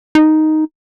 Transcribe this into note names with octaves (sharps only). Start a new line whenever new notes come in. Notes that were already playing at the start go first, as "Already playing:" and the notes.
D#4